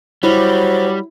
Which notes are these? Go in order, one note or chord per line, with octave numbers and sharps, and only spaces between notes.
F#3 G3 E4 C5